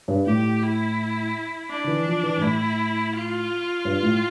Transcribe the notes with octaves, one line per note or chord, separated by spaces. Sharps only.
G2
A2 G4
E4
D4
D3
E3
F3
E3
G2
A2 E4
F4
G2
A2